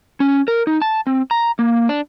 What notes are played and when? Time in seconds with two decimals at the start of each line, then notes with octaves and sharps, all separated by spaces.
0.20 C#4
0.48 A#4
0.67 D#4
0.82 A5
1.07 C4
1.31 A#5
1.59 A#3
1.89 D4